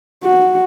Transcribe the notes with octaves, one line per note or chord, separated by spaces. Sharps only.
F#4